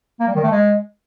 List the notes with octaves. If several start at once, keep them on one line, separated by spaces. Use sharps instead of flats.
A#3
G3
D#3
A3
G#3